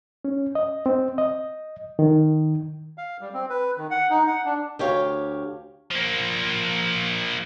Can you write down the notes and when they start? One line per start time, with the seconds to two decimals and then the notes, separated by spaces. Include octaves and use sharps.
0.25 C#4
0.55 D#5
0.86 C4
1.18 D#5
1.99 D#3
2.98 F5
3.21 G3
3.34 C4
3.50 B4
3.77 D#3
3.91 F#5
4.10 D#4
4.27 F#5
4.45 D4
4.79 D2 G4 C#5 F5
5.91 F3 A#3